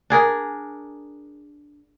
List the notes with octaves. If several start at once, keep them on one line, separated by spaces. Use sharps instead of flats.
D4 G#4 A#4